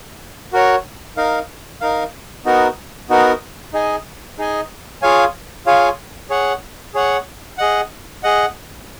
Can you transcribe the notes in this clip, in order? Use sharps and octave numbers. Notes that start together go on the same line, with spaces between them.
F#4 A#4 C#5
D#4 A#4 F5
D#4 A#4 F5
B3 D#4 F#4 A#4
B3 D#4 F#4 A#4
D#4 G#4 D#5 G#5
D#4 G#4 D#5 G#5
F4 G#4 C#5 F5 G#5
F4 G#4 C#5 F5 G#5
G#4 C#5 F#5
G#4 C#5 F#5
G#4 D#5 F#5
G#4 D#5 F#5